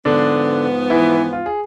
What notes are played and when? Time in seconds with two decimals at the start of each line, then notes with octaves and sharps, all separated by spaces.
0.05 G#2 D3 F3 B3 D4
0.90 E3 E4
1.33 F4
1.46 G#4